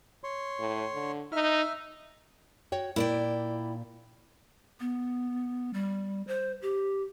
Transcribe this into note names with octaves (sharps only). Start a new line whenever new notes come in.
C#5 C6
A2
D3
D#4 E5 F6
F#4 C#5 G5
A#2 E4 D5 G5
B3
G3
C5
G4